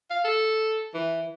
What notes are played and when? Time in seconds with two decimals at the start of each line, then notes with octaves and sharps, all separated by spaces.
0.10 F5
0.25 A4
0.95 E3